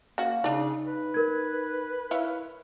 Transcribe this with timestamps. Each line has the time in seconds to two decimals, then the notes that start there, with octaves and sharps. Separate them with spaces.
0.18 A#3 C#4 F#4 F5
0.44 C#3 D4 D#4 D5
0.86 B4
1.14 A#4 G#6
2.11 E4 C#5 F5